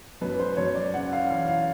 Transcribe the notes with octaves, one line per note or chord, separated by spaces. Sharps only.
F#2 B4
C5
F#2 C#5
D5
C#3 F#5
F5
E3 F5
F5